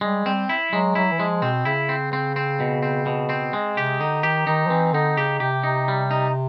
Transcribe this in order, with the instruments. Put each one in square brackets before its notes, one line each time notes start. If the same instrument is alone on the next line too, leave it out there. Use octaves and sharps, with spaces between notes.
[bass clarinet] G3 [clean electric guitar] G#3
[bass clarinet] G3 [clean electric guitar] C4
[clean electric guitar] E4
[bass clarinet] F#3 [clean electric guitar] G#3
[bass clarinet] F#3 [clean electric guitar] E4
[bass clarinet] E3
[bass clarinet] F3 [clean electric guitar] G#3
[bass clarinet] B2 [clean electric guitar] C4
[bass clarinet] C#3 [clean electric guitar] E4
[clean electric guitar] C4
C4
C4
B2
C4
B2
C4
G#3
[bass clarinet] C3 [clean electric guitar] G4
[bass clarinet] D3 [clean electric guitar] D#4
[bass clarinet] D#3 [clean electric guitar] G4
[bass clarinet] D#3 [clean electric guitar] D#4
[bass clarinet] F3
[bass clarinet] E3 [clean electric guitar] C4
[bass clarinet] D3 [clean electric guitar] D#4
[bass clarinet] C#3 [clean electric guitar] G4
[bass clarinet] C3 [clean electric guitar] G4
[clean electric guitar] D#4
G3
D#4